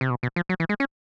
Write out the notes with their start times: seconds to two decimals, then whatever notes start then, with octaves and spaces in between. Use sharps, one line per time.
0.01 C3
0.10 B2
0.23 B2
0.36 F3
0.49 F#3
0.60 E3
0.69 G#3
0.80 C#4